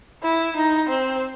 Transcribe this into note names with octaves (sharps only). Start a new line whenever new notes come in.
E4
D#4
C4